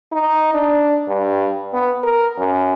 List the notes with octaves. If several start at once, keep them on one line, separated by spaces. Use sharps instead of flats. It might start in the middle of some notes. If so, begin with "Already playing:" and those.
D#4
D4
G2
B3
A#4
F#2